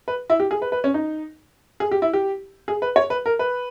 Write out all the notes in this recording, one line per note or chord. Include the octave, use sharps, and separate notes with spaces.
B4
E4
G4
G#4
B4
B4
C#4
D#4
G#4
G4
E4
G4
G#4
B4
C#5
B4
A#4
B4